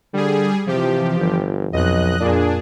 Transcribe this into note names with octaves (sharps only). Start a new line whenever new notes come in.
D3 G3 G#4
C3 E3 F3 G4
G1
B1 F2 D#5 F#6
A#2 D4 G#4